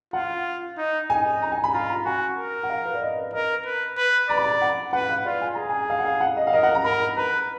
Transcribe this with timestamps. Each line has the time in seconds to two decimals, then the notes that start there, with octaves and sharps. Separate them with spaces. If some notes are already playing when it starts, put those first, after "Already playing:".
0.13 F4 F#5
0.78 D#4
1.10 D#4 G#5
1.42 A#5
1.52 G#5
1.64 B5
1.74 F4 A#5
1.89 A#5
2.05 F#4 G#5
2.38 A#4
2.63 F#5
2.70 F5
2.86 B4
2.94 D5
3.02 D#5
3.33 A#4 D#5
3.66 B4
3.97 B4
4.29 D5 A#5
4.37 B5
4.44 A#5
4.61 F#5
4.93 B4 F#5
5.09 F5
5.25 F4 D5
5.41 G#5
5.55 G#4 A#5
5.69 G#5
5.90 F5
5.99 F#5
6.06 F5
6.21 F#5
6.36 D#5
6.47 F5
6.53 A#4 D#5
6.63 F#5
6.75 A#5
6.84 A#4 B5
7.17 B4 A#5